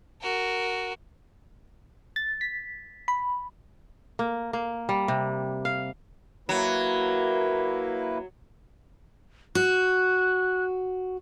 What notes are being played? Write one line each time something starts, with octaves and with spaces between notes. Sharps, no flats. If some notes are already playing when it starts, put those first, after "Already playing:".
F#4 A#4
A6
B6
B5
A#3
A#3
G3
C3
F5
F#3 A#3 E4 B4
F#4 F#6